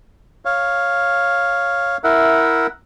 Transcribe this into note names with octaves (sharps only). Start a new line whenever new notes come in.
C#5 F5
E4 A#4 E5 F#5